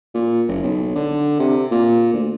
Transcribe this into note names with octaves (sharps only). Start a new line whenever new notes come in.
A#2
F#1
B1
D3
C3
A#2
D2